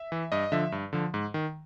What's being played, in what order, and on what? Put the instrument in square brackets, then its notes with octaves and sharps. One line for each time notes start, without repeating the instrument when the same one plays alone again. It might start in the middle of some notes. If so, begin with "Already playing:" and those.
Already playing: [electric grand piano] E5
E3
G2 D#5
D3 F3 E5
G2
D3 F3
G#2
D#3